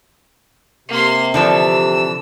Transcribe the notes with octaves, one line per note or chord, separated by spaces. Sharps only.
C3 A#3 C6
D3 E3 F3 E6